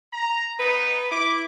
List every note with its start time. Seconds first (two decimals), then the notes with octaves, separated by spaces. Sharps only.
0.13 A#5
0.59 B3 D#4 B4
1.11 E4 D6